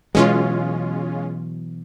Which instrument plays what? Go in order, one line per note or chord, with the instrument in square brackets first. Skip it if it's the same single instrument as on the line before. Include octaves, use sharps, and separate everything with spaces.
[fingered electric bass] B2 E3 F#3 [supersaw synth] G#3 C#4 F4